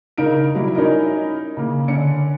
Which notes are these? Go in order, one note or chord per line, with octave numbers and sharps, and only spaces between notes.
C#3 D#4 A#4 F5 D7
F#3 G3 E4
C#4 D#4 E4 A#4 D#5
C#3 A#3
D3 C#4 C#7